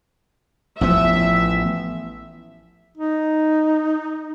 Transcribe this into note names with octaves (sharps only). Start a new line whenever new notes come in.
A1 F3 B3 E5
D#4